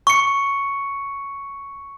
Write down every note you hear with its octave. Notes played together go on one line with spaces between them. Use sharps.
C#6 C#7